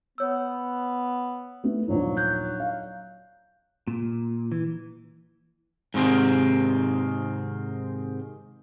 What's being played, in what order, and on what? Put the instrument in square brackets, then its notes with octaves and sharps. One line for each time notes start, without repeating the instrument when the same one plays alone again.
[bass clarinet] B3 [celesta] C#5 E6
[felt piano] A3 B3 D#4
[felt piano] A#1 D#2 [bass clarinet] F#3
[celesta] F#6 G6
[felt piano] F5
[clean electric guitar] A#2
E3
G#2 C3 D#3 C4